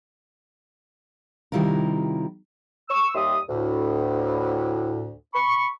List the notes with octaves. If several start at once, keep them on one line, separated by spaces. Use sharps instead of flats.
C3 D#3 G3 E4 F4 A#4
C#6 E6
D#2 G3 E5 C6 D#6
D2 A2
B5 C#6